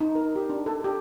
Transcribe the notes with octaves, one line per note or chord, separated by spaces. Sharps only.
D#4
A#4
G4
D4
A4
G4